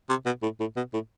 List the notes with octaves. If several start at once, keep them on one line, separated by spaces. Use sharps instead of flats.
C3
B2
A2
A2
B2
A2